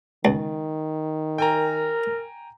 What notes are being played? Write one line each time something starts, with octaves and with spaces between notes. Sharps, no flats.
C#2 D#3
A#4 G5 G#5 A#5